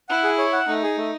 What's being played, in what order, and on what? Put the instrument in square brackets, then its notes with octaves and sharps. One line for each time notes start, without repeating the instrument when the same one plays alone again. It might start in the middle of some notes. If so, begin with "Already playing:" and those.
[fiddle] E4 [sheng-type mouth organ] F#5
[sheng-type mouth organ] G#4
C#5
F#5
[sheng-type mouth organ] A3 [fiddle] D#4
[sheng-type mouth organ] G#4
A3